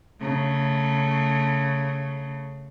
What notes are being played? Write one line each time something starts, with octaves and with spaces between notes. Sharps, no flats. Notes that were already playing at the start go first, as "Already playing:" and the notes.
C#3 A3